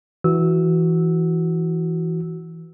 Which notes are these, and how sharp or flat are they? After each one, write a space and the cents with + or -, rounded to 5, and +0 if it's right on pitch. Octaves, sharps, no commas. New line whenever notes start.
E3 +0 F#4 +5 E6 -15